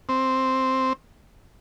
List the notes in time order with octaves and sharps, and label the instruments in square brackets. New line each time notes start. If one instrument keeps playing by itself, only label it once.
[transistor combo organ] C4